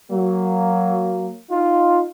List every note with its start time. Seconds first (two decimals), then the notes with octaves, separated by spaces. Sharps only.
0.11 F#3 A#3
1.51 D#4 F4